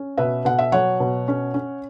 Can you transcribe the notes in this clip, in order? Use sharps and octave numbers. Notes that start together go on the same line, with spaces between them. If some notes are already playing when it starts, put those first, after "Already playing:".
Already playing: C#4
B2 B4 E5
B2 F#5
E5
F#3 C#5 F#5
B2
C#4
C#4